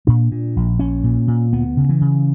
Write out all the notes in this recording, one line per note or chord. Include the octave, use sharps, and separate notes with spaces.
A#2 D4
A#2
A#1
A#1 C#4
A#2
A#2
D2 B3
C#3
E3
C#3